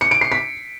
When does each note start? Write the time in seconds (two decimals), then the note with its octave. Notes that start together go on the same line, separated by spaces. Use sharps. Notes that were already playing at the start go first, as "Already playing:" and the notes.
0.01 C#7
0.11 D7
0.21 C7
0.32 B6